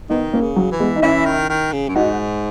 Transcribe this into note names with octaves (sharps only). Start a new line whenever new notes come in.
D#3 B3 D#4
A#3 C#4
C#3
F#3
E3
G#3 B3
D#4
E3 C#4 E4
D#3
D#3
C#3
F#2
G#2 D#4 F#4